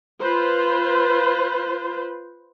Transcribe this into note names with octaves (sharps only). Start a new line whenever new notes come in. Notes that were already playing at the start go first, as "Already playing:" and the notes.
F4 B4 C5